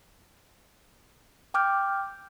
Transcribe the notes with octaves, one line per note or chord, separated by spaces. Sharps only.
G5 D6 F6 G6